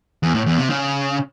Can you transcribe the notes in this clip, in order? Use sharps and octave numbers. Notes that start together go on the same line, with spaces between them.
E2
A2
E2
C3
C#3